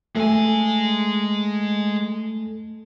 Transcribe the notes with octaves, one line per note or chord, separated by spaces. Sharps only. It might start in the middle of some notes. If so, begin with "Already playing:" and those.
G#3 A3 A4 G#5